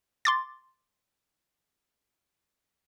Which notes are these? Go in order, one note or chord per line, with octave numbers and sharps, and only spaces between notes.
C6 D6 A6